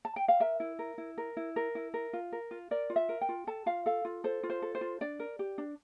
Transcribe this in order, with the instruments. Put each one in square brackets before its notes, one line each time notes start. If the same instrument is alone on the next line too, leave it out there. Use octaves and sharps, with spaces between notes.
[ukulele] A5
G5
F5
A#4 E5
E4
A#4
E4
A#4
E4
A#4
E4
A#4
F4
A#4
F4
A#4 D5
F4
E5
A#4
G5
F4
A4 A5
F4 F5
A4 F5
F4
A4 C5
F4
C5
A4
C5
F4
D4 D5
A#4
G4
D4